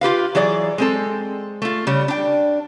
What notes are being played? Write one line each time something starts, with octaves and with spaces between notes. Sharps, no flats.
F4 G4 B4 F5
E3 F#3 G#4 D5
G#3 C4 A4
A3 F4
C#3 G3
D4 G5